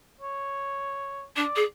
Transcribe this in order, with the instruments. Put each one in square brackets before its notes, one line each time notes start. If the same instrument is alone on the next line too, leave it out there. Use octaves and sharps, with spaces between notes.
[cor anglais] C#5
[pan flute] D4 [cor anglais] D5
[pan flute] G#4